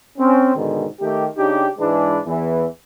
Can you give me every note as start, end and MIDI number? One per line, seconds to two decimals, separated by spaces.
0.18 0.52 60
0.18 0.52 61
0.55 0.86 44
0.55 0.86 47
0.55 0.86 50
0.55 0.86 51
1.00 1.25 51
1.00 1.25 57
1.00 1.25 67
1.37 1.68 49
1.37 1.68 62
1.37 1.68 63
1.37 1.68 67
1.79 2.20 44
1.79 2.20 52
1.79 2.20 56
1.79 2.20 62
1.79 2.20 71
2.26 2.66 40
2.26 2.66 52